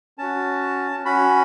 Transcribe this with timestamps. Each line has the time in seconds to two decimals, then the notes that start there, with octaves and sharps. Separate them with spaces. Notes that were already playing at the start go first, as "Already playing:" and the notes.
0.18 C#4 F#4 A5
1.05 C#4 F#4 B5